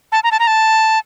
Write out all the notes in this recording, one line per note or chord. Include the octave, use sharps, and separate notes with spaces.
A5
A#5
A5
A#5
A5